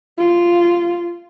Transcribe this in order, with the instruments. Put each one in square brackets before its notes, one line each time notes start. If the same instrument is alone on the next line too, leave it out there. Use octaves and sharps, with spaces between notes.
[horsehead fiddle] F4